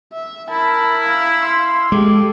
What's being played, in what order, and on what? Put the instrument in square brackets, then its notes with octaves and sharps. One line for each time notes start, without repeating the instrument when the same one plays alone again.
[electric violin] E5
[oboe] E4 [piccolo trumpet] A#4 [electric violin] A5 B5
[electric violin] F5 E6
[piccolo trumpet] C6
[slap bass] G#3 [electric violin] G4 A4 [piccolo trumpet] D6